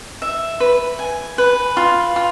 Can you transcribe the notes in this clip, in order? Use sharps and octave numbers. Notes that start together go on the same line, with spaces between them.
E5
B4
G#5
B4
F4
F4